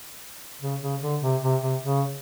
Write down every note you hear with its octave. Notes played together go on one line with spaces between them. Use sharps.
C#3
C#3
D3
C3
C3
C3
C#3